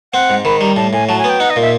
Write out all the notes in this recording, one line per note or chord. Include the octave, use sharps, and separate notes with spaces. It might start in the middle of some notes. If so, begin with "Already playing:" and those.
C4 F#5
G#2
D#3 B5
G3 A#5
A2 A5
A2 G#5
F#3 A5
G#5
B3
G5
D#4 F#5
D#5
A#2
E5